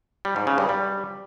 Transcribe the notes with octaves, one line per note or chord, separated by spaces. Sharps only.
G3
G#2
C#3
G2
G3